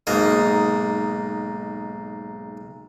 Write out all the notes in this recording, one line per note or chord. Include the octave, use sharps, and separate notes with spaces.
B1 G#2 A#3 D#5